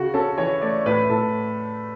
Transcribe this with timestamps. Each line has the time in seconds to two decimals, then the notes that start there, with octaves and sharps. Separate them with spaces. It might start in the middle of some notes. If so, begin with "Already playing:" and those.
Already playing: C#3 F#4
0.14 C#4 A4
0.38 E3 C#5
0.61 A3 D5
0.86 A2 B4
1.10 A2 A4